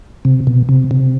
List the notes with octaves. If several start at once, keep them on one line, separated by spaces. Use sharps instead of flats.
C3
B2
C3
C3